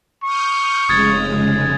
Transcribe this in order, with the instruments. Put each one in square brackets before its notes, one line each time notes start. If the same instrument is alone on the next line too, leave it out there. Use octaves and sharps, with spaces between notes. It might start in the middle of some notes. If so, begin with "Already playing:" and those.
[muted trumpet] C#6 [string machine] D#6 F6 G6
[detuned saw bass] F1 [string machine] C#3 G#3 [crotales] D#6 G#6 A6